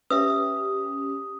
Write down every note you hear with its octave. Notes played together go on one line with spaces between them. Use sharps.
C#4 G4 B4 E5 D#6